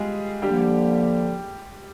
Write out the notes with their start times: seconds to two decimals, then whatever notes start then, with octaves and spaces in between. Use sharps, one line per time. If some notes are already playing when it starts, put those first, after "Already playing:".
Already playing: G3 G#3 F4 G#4
0.42 D3 F3 G3 A#3 G4